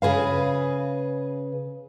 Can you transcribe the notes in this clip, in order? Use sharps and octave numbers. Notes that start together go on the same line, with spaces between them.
C#3 G#4 B4 F5